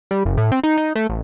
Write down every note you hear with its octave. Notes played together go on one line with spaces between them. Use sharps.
G3
F#1
A2
C4
D#4
D#4
A3
A1